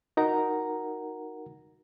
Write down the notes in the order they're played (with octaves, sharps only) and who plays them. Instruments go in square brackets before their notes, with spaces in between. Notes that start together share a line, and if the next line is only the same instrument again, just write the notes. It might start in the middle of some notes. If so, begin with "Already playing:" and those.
[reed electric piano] D#4 F#4 A#4 F#5 A#5